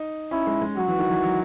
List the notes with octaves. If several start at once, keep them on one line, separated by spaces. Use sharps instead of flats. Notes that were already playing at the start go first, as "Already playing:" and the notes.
Already playing: D#4
C#4 E4
G#3
G#3
F#3 F#4
E3
D#3
E3
F#3